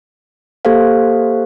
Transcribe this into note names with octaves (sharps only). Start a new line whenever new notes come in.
A#3 G4 A4 C5 F5